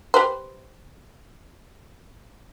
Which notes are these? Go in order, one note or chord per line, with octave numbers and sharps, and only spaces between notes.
G4 B4 C5